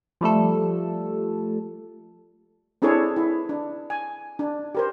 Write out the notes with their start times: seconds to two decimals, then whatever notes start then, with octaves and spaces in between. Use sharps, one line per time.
0.21 F3 G3 A3 A4
2.82 C4 D4 E4 G#4 A4 C#5
3.16 E4
3.49 D4
3.90 G#5
4.39 D4
4.75 G4 A#4 C5